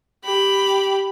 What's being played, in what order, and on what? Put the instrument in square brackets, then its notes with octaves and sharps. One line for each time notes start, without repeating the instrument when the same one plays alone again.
[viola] G4 [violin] B5